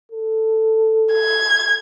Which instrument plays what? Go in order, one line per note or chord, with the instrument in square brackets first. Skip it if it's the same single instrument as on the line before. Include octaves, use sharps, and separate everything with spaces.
[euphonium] A4
[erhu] G#6